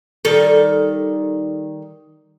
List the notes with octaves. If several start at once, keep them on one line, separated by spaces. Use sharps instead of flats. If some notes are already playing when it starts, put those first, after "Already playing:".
D#3 G3 A4